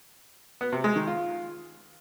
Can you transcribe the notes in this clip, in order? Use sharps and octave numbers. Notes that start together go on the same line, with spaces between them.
B3
C3
G#3
D#3
F4